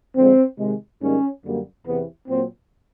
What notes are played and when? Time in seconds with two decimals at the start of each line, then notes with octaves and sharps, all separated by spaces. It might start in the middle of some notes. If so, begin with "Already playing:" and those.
0.16 F2 D3 F3 G#3 C4
0.58 C3 D#3 G#3
1.00 G#2 D#3 G3 A#3 C#4
1.44 F#2 D3 G3 A#3
1.85 E2 C3 E3 B3
2.28 A#2 F#3 A#3 C4